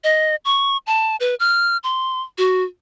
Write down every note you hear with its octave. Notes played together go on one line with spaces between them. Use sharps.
D#5
C#6
A5
B4
F6
C6
F#4